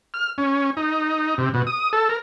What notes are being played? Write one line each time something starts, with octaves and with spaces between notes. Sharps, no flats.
F6
C#4
D#4
C3
B2
D#6
A4
A#4